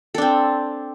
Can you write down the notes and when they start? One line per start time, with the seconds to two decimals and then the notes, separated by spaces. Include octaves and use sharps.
0.15 A4
0.18 D4
0.22 C4